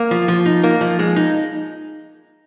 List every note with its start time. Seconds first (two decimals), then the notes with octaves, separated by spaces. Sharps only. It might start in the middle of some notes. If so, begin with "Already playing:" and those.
Already playing: A#3
0.11 F3
0.28 F3
0.46 D#4
0.64 A#3
0.81 F3
0.99 G#3
1.16 D#4